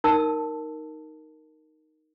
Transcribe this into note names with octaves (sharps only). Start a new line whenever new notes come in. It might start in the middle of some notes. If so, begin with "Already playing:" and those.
D#4 A#4 A5 E6